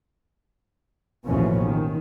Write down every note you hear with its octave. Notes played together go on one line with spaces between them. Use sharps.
A1 D#2 B2 E3 F3 C#4
D#3